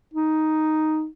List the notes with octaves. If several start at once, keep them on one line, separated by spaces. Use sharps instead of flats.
D#4